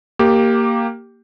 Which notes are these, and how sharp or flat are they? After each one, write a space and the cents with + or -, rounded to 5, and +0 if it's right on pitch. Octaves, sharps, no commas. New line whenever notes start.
A#3 -10 G4 +0